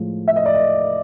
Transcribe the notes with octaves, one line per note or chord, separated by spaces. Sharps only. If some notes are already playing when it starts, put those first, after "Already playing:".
Already playing: A2 F3 G#3
E5
D#5
D5
D#5